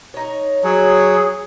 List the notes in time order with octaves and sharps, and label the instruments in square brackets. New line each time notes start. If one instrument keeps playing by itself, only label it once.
[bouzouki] D#4 C#5
[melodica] F#3 [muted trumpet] G#4